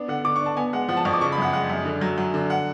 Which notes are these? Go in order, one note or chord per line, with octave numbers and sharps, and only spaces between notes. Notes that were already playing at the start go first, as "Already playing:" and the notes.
Already playing: B3 D4
D3 F#5
D3 D6
C#6
D4
A5
B3 G#5
G#3 F#5
F3 F#5
A5
F2 C#6
D6
C#3 C#6
B5
F#2 F#5
G#3 F#5
F#2
D3
F#3
F#3
D3
F#5